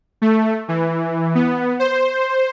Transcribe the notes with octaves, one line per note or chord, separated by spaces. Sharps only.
A3
E3
B3
C5